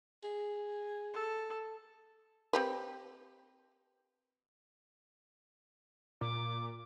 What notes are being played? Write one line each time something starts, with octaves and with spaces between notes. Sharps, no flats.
G#4
A4
C4 G4 B4
A#2 D6